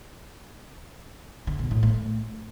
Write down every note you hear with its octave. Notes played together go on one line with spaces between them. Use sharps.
D3
B2
A2
A3